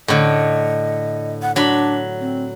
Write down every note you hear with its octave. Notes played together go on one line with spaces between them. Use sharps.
A2 D3 D#5
F#5
F#3 D4 B5
C4